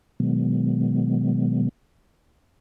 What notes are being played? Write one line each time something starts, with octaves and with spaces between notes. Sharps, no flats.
B2 D#3 F#3 G#3 B3